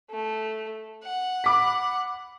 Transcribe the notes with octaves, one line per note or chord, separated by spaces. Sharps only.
A3
F#5
B5 D6 B6